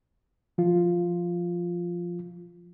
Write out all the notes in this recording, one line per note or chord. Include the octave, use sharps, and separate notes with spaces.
F3 F4